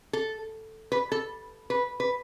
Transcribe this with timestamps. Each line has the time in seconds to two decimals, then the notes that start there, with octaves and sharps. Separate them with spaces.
0.13 A4
0.92 B4
1.12 A4
1.70 B4
2.00 B4